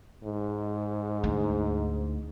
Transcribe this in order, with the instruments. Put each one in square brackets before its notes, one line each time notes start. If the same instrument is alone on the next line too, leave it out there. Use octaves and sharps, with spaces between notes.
[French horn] G#2
[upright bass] D2